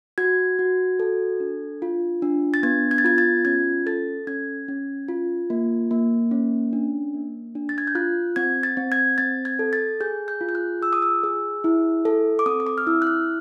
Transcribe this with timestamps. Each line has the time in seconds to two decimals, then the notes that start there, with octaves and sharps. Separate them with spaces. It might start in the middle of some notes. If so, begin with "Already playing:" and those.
0.18 F#4 G#6
0.59 F#4
1.00 A4
1.40 D4
1.82 F4
2.22 D4
2.54 A6
2.63 B3 G#6
2.91 G#6
2.98 A6
3.05 F4 G#6
3.18 A6
3.45 C#4 G#6
3.86 A4 A6
4.27 C#4 G#6
4.68 C#4
5.08 F4
5.50 A#3
5.91 A#3
6.31 C#4
6.73 D4
7.14 A#3
7.55 D4
7.69 A6
7.78 G#6
7.87 G6
7.95 F4 F#6
8.36 C4 G#6
8.63 A6
8.77 C4
8.92 G#6
9.18 C4 A6
9.45 G#6
9.59 A4
9.73 A6
10.01 G#4 G6
10.28 G6
10.41 F4
10.49 G6
10.55 F#6
10.82 G#4 E6
10.93 D#6
11.02 E6
11.24 G#4
11.64 E4
12.05 A4
12.39 D6
12.46 C4 D#6
12.60 D#6
12.67 D6
12.78 F6
12.87 E4 E6
13.02 F#6
13.07 F6